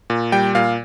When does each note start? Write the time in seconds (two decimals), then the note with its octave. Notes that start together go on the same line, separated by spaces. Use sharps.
0.10 A#2
0.32 G3 G5
0.55 A#2 F5